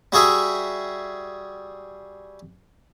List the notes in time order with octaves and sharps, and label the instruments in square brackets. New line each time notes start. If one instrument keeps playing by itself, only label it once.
[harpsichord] G3 F#4 G#4 E5